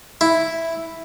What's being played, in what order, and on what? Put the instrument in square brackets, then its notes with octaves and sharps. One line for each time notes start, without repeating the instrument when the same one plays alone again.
[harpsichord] E4